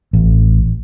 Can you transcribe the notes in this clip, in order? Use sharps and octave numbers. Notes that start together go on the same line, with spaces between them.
A1